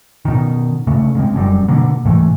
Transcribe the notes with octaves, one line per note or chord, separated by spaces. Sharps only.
B2 D#3
C#3 A3
C#3 G#3 C4
F1 F#2 G3
B2 D3 A#3
G#2 C3 E3 A3